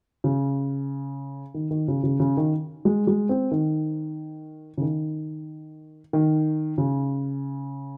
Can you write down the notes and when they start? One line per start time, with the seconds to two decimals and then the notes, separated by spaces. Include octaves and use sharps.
0.24 C#3
1.54 D#3
1.71 D#3
1.88 C#3
2.03 C#3
2.20 C#3
2.37 D#3
2.85 G#3
3.07 G#3
3.29 C4
3.51 D#3
4.78 C#3
4.82 D#3
6.13 D#3
6.78 C#3